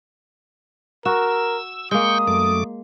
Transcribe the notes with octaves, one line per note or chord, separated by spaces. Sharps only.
F#4 A#4 E6
G#3 A#3 G5 C#6 D#6 G6
F#2 A3 D6